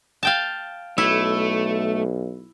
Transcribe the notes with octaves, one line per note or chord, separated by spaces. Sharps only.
F5 G5 A5
B1 A3 E4